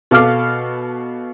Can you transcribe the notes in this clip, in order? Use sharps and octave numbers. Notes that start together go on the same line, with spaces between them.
B2 A4 F5 D6 F6